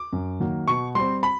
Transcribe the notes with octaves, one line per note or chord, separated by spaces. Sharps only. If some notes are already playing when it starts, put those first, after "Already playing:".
Already playing: D6
F#2
D#3 F#3 A#3
B2 C#6
G3 C4 C6
B5